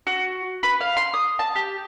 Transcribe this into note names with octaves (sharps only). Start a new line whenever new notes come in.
F#4
B4
F5
C6
D#6
A5
G4